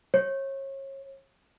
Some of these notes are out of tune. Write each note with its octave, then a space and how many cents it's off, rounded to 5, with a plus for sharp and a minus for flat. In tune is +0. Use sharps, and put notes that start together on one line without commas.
C#5 -30